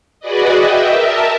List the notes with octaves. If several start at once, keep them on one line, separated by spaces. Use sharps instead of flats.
F#4 G#4 B4 D5 D#5
D#5 E5 G5
A#4 E5 A5